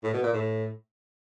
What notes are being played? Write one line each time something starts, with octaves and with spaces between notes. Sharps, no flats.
A2
B2
A#2
A2